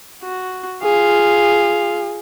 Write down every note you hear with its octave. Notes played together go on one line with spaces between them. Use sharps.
F#4
F4 G#4 F5